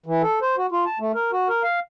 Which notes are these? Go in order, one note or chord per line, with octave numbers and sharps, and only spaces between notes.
E3
A4
C5
F#4
F4
A5
A3
A#4
F#4
A#4
F5